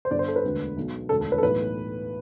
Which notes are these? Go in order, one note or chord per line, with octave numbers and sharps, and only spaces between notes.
C5
G1 G2 D3 D5
C5
A4
B4
E1 D2 D3
B1 B2
E1 D2 D3 A4
A4
B4
A4
B1 A2 E3 B4